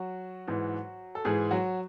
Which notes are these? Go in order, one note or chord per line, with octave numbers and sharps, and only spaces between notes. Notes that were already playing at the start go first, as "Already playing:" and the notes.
Already playing: F#3 F#4
G#2 E3
A4
G#2 E3 G#3 G#4
F#3 F#4